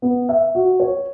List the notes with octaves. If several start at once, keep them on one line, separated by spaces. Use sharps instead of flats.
B3
E5
F#4
C#5